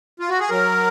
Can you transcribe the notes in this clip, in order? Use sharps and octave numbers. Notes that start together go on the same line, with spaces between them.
F4
F#4
G#4
F#3 A#4